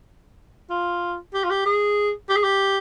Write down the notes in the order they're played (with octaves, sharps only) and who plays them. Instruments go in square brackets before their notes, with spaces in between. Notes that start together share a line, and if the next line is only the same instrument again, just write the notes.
[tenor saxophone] F4
G4
F4
G4
G#4
G4
G#4
G4